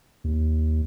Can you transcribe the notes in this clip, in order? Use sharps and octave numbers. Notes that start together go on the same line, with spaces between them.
D#2